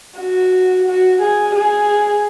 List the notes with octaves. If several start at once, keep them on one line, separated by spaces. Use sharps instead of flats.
F#4
F#4
G#4
G#4